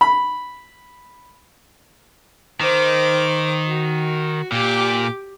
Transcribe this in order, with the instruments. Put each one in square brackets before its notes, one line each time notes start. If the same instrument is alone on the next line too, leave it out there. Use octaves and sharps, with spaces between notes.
[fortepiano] B5
[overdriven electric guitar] D#3 [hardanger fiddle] C5 D6
[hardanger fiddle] F#4
[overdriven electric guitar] A#2 [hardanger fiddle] G4 D6